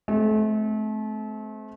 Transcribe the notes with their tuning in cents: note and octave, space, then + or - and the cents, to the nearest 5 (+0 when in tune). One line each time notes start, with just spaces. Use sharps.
A3 -35 C4 +0